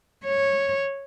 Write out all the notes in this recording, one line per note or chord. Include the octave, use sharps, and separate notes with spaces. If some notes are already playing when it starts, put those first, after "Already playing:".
C#5